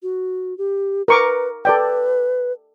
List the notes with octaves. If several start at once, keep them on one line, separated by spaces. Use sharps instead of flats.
F#4
G4
A#4 B4 C#6 D6
A4 B4 D5 G5